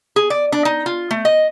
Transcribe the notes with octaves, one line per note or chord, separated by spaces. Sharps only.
G#4
D5
D4
D#4
F4
A3
D#5